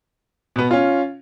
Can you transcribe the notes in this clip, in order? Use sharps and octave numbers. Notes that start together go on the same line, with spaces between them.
B2 B3
C#4 F4